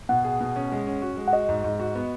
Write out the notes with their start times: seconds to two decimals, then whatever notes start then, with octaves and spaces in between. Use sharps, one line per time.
0.09 B2 F#5
0.24 G#4
0.41 B2
0.56 C#4
0.72 G#3
0.87 C#4
1.02 F#4
1.17 G#3
1.28 F#5
1.33 F#4 D#5
1.49 G#2
1.64 G#2
1.80 F#4
1.95 B3